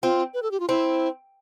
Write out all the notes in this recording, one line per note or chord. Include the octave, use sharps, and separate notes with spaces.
C4 F4
B4
A4
G4
F4
C4 E4